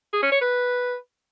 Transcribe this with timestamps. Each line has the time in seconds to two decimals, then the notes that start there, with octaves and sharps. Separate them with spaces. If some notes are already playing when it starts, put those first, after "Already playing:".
0.13 G#4
0.22 C#4
0.32 C#5
0.41 B4